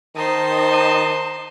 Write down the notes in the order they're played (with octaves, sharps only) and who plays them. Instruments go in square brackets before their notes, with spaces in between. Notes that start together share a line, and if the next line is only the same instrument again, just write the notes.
[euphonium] D#3 [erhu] D#4 [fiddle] C5 D#6 [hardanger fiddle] A5 C6